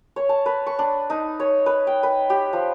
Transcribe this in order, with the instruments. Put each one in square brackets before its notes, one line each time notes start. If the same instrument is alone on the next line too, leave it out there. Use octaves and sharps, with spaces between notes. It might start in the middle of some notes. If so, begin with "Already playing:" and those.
[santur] C#5
A5
B4
C#6
D4
D#4
C#5
B4
G5
B4
G4
F3